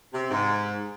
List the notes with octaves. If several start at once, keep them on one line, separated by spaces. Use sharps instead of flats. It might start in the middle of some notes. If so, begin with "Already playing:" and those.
C3
G#2